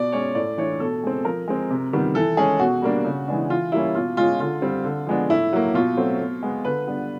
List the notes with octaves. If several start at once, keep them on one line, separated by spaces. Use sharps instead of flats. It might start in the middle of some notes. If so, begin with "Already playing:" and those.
Already playing: B2 D5
G#3 C#4 C#5
A2 D5
E3 A3 D4 C#5
B2 A4
G#3 C4
F3 A#4
G#3 C4
C3
D#3 G3 B3
E3 A4
G#3 C#4 G#4
B2 F#4
G3 A#3 D4
C#3
E3 G#3 B3 D4
E3 F4
G3 A#3 C#4 E4
B2 F4
G#3 C#4 F4
D3 F4
G3 C4
D3
F3 G#3 B3 D4
A2 E4
F#3 A#3
B2 F4
F#3 A3 C4
B2
G#3 B3
D3 B4
G3 B3 D4